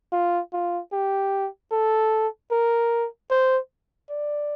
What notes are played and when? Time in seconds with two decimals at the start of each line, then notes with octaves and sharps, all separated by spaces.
0.13 F4
0.53 F4
0.92 G4
1.72 A4
2.51 A#4
3.30 C5
4.10 D5